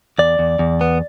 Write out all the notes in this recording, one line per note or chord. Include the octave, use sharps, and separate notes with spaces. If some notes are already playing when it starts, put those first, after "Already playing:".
E2 D5
E2
E2
B3